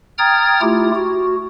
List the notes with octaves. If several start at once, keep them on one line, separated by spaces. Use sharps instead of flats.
G5 A#5 D#6 F6 G#6 A6
A3 E4 F4 G4
F#4